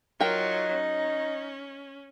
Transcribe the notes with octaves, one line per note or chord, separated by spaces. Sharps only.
F#3 D#4 F4 A#4 G5
C#4